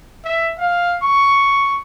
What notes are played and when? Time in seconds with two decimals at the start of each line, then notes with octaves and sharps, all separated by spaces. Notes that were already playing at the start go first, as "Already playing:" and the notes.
0.25 E5
0.59 F5
1.03 C#6